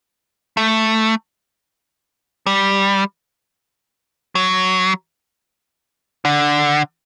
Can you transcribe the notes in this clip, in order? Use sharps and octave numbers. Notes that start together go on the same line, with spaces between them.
A3
G3
F#3
D3